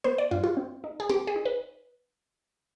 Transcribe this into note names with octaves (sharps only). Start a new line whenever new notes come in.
B3 C5
D5
G2 F4
F4
C4
D#4
G#4
C4 G4
G#4
D#4
B4